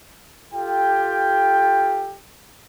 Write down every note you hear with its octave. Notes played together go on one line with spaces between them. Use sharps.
F4 G4 A4 G5